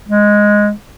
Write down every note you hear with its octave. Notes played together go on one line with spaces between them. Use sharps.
G#3